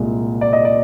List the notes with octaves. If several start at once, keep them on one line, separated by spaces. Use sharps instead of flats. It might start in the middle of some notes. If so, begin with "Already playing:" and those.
Already playing: C2 A#2 G#3
D5
D#5
D5